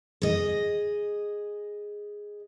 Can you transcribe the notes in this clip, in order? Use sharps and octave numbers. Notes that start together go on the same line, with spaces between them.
G#4 D#5